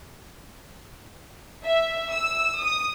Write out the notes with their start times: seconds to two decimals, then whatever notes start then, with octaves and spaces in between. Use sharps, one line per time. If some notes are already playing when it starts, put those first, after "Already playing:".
1.64 E5
2.12 E6
2.61 D#6